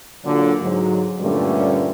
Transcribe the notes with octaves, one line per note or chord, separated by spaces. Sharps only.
A#2 D3 F#3
G#2 F#3
G2 A#2 D3 G3 A3 C#4